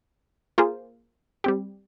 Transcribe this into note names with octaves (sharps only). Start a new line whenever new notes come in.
A#3 F4 G#4 C5
G3 C4 G4